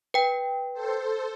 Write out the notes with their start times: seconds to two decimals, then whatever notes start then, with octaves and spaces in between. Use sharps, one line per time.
0.14 B4 G5
0.73 A4 C5